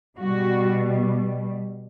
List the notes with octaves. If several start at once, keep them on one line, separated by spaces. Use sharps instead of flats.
B2 G3 F#4